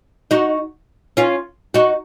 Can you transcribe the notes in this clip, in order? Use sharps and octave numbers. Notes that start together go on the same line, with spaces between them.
D#4 F#4
C#4 F4
D#4 F#4